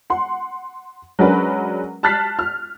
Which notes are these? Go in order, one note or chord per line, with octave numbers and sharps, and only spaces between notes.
F#5 C6
F#3 G#3 C#4 D4 A#4 B4
A5 F6 F#6 A6 B6 C7
F6